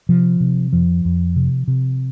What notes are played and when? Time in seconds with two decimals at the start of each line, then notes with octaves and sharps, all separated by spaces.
0.09 C3 F3
0.40 C3
0.73 F2 F3
1.05 F2
1.36 C3
1.68 C3